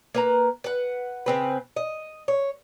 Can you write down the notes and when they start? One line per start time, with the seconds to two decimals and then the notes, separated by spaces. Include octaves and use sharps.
0.14 A#3 B4 A#5
0.64 B4 F#5
1.26 C#3 C4 B4
1.76 D#5
2.28 C#5